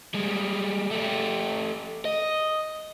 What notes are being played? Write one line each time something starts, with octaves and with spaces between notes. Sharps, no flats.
G3 G#3
A3 G4
D#5